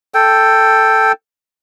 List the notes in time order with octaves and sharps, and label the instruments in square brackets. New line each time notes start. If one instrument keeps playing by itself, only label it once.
[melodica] A4 G5